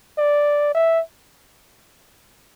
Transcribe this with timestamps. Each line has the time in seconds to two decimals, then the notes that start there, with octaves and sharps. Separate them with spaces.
0.18 D5
0.74 E5